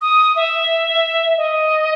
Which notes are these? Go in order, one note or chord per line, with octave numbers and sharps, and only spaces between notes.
D#6
E5
D#5